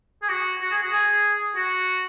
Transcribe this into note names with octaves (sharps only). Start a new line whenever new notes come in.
G#4
F#4
F#4
G#4
F#4
G#4
F#4